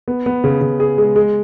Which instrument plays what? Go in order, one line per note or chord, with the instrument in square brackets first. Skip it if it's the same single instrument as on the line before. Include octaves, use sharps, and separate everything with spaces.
[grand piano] B3
B3
C#3
C#3
G#4
G#3
G#3